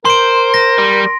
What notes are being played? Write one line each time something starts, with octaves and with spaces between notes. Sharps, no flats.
A#4 C5 C6 D7
A#6
G3